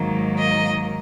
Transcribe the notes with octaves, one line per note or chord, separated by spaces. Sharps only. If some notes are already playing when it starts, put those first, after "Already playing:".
Already playing: G#2 D#3 F#3 A#3
D#5